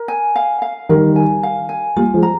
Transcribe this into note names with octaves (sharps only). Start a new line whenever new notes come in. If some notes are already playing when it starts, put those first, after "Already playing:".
Already playing: A#4
G#5
F5
F5
D#3 G3 A#4
G#5
F5
G#5
G3 A#3 F4
F3 G#3
A#5